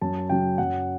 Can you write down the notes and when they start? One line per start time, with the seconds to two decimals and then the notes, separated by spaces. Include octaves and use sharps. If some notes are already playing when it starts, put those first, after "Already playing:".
0.01 F#2 A5
0.30 C#3 F#3 G5
0.58 F#2 F#5